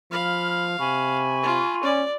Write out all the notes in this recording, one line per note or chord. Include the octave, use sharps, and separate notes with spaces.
F3 F5 B5 F6
C3 G#5 B5 C#6
F4
C#4 D5